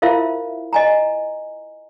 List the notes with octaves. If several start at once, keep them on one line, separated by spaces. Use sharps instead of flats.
E4 F4 A#4 C5 E5 F5
D#5 G#5 A#5